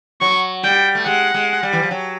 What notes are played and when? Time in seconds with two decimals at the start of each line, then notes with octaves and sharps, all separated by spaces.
0.21 F#3 C#6
0.63 G3 G5
0.95 A3
1.06 G#3 F#5
1.34 G#3
1.63 G3
1.73 E3
1.82 F3
1.91 F#3